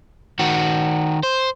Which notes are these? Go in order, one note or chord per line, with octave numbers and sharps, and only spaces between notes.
D#3 F#4
C5